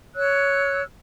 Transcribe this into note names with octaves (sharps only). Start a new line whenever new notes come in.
C#5 E6 F#6